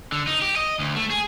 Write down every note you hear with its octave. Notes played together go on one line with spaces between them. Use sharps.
D3
D#4
G4
D#5
D2
A3
G#4